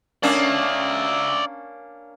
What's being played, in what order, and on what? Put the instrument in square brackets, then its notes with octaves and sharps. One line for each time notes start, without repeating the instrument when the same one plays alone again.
[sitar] A#3 C#4 D4 [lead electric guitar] D5 E5